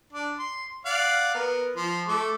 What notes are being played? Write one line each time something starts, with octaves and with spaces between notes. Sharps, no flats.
D4
C6
D5 F5 F#5
B3 A#4
F3 C5
A3 A4 D6